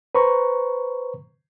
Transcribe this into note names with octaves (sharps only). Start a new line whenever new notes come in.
B4 C5 A#5 C#6